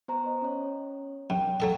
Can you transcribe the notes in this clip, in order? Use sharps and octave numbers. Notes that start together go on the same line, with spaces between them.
B3 C5 A#5
D#5
C#4 C#5
F#2 G5
F#3 A4 D#5